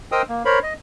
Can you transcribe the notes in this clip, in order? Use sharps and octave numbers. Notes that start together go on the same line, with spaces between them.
A#4 C5 D#5 G5 D#6 E6
A#3
A#4 C5 C#5 B5
D#5